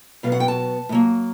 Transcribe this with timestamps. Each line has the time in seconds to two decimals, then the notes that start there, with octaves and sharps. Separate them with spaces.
0.23 B2 F#3 B3 F5
0.32 F#5
0.40 G5
0.48 A5
0.89 A2
0.92 F#3 A#3